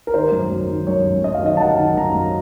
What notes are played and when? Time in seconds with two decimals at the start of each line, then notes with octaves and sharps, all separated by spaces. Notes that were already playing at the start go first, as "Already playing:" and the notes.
0.07 A#4
0.14 D#3 C5
0.32 F#2
0.51 F#2
0.69 D#3
0.87 F#2 C#5
1.05 F#2
1.24 F#2 D#5
1.34 F5
1.43 D#3 D#5
1.57 A5
1.60 F#2 F#5
1.78 D#3
1.97 F#2 A#5
2.15 F#2